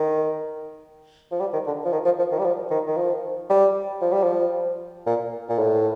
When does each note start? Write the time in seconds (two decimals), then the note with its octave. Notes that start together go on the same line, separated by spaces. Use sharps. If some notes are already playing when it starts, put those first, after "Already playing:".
Already playing: D#3
1.31 F3
1.40 G3
1.53 D#3
1.67 D3
1.85 F3
1.93 D#3
2.05 F3
2.19 F3
2.32 D#3
2.39 G3
2.45 F3
2.71 D#3
2.87 D#3
2.97 F3
3.50 G3
4.01 F3
4.12 G3
4.23 F3
5.07 A#2
5.49 A#2
5.59 A2